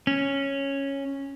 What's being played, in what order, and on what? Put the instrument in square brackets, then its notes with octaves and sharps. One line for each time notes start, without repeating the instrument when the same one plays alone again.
[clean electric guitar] C#4